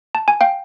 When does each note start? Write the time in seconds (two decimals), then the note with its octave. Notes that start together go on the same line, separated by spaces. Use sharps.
0.15 A5
0.28 G#5
0.41 F5 G5